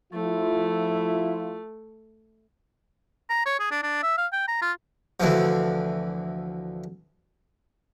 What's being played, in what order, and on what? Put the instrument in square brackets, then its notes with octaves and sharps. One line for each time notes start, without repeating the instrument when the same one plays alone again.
[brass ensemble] F3 E4 F4 [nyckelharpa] A3
[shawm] A#5
C#5
G#4
D4
D4
E5
F5
G5
A#5
F4
[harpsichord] D2 E3 F3